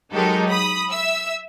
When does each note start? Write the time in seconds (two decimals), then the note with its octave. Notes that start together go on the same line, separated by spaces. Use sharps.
0.12 F#3 G#3 D#4 G4 A4 A#4
0.49 B5 D#6
0.91 E5 E6